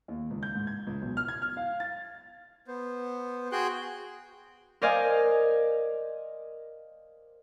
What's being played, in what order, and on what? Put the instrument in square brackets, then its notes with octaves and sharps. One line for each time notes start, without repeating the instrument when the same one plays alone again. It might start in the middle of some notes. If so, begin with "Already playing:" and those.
[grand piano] D#2
C#2
G6
G#2
G#6
C#2
B1
F6
G#6
F6
F5
A6
[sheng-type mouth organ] B3 C5
F#4 G#4 G5 C6 F#6 G6
[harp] A#4 C5 D5 D#5 F5 G#5